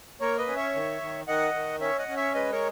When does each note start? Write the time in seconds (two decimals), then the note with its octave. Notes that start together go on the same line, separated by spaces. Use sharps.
0.21 A#3 A#4 C#5
0.38 B4 D#5
0.47 C#4
0.56 C#5 E5
0.75 D#3
1.02 D#3
1.27 D#3 D#5 F#5
1.54 D#3
1.81 C#4 C#5 E5
1.98 D#5 F#5
2.08 C#4
2.17 C#5 E5
2.34 G#3 B4 D#5
2.52 A#4 C#5